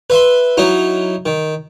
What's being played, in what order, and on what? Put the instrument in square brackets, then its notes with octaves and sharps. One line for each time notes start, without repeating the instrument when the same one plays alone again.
[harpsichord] B4 E5 C6
F#3 D#4 E4
D#3